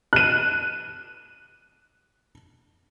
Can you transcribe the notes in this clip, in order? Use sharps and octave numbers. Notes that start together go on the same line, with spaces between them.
F#6 D#7